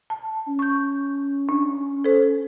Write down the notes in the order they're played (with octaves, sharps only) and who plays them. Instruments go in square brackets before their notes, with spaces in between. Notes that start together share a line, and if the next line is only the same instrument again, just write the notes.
[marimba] A5
[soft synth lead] C#4
[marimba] C#6 G6
D4
A4 C5